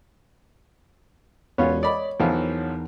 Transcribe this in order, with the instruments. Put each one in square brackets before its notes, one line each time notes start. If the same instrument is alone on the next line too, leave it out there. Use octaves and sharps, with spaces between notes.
[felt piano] E1 [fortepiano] B3 C#4 F4 [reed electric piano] C#5
[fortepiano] D5 B5 [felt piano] D#5
[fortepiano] B1 E3 F3 [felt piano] E2 D#4 A#4